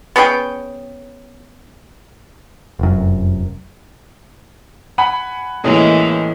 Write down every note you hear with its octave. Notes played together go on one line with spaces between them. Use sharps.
B3 C#4 G#4 G5
F1 F#2
F#5 G#5 B5
A2 E3 G#3 A#3 C#4 D#5